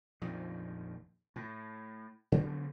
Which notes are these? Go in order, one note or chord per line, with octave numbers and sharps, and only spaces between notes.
A#1 F2 D#3
A2
C#3 F#3 B3 C#4